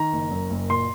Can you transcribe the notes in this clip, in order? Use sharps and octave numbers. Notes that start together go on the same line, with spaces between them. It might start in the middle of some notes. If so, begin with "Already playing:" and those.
Already playing: D#3 A#5
F#1
F#2
F#1
A#2 C6